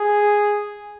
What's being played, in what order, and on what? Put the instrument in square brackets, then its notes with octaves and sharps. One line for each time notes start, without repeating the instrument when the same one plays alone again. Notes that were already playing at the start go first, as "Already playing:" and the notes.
Already playing: [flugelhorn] G#4